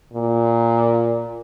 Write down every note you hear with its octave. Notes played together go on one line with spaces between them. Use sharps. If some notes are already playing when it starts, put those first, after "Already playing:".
A#2